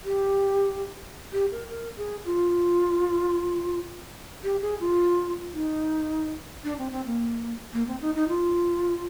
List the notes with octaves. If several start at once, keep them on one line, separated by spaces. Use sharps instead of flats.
G4
G4
A#4
A#4
G#4
F4
G4
G#4
F4
D#4
D4
C4
C4
A#3
A#3
C4
D#4
D#4
F4